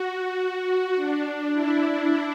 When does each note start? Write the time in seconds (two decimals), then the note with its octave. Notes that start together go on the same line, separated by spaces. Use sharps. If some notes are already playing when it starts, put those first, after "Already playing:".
Already playing: F#4
0.96 D4
1.53 E4